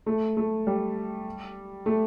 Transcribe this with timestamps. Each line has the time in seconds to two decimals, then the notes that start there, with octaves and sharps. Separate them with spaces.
0.06 A3
0.37 A3
0.67 G3
1.86 A3